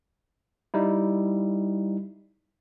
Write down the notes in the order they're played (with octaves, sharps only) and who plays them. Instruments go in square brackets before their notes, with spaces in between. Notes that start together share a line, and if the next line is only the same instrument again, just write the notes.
[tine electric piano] G3 D#4 E4